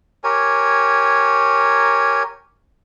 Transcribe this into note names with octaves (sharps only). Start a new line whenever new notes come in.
G4 A#4 C#5 G#5